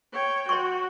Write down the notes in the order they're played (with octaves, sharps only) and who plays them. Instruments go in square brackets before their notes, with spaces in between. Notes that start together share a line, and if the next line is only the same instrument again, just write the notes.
[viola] C#5 G5
[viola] F#4 [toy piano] C#5 C6 C#6